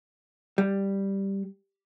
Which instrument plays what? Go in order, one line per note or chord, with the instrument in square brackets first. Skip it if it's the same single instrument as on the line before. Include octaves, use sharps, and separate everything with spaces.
[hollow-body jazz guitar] G3